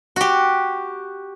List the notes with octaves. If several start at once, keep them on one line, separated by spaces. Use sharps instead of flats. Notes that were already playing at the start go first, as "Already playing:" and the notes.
F#4 G4